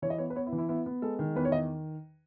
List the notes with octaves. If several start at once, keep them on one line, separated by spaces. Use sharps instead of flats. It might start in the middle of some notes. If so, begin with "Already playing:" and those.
E3 C#5
D#5
B3 C#5
B4
B3 C#5
E4
E3
E4
B3 E4
B3
G#3 A4
D#3
E2 B4
C#5
D#3 D#5